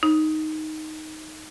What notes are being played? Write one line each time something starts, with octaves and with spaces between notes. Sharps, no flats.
D#4